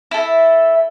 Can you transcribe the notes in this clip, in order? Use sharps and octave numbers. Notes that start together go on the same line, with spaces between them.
E4 A4